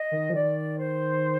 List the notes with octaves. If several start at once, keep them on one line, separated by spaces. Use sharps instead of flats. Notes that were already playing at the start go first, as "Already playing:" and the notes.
Already playing: D#5
D#3
F3
D#3 D5
C5